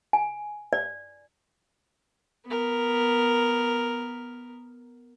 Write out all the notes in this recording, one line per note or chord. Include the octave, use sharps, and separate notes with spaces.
G#5
D5
B3 A#4